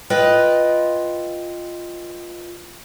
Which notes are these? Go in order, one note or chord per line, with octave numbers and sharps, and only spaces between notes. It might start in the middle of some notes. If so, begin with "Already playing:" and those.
F4 B4 D#5 G5